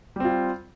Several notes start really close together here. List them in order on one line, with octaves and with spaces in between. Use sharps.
G3 C4 F4